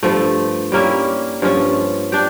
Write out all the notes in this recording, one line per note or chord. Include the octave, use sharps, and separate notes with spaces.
G2 F3 A3
G3 A#3 C#4 E4
G2 F3 C#4
D4 G4